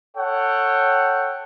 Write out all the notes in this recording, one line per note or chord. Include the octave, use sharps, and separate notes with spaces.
A4 C#5 F#5 G5